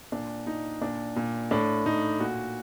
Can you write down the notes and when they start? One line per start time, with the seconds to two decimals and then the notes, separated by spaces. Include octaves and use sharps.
0.12 A#2 D4
0.47 A#2 D#4
0.81 A#2 D4
1.16 A#2
1.51 A2 D4
1.85 A2 D#4
2.20 A#2 F#4